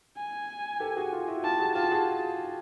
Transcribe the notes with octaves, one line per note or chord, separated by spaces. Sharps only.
G#5
G4 A4
F#4 G#4
F4 G4
E4 F#4
F4 G4 A5
F#4 G#4
F4 G4 A5
F#4 G#4